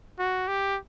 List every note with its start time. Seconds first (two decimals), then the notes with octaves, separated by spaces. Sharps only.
0.19 F#4
0.48 G4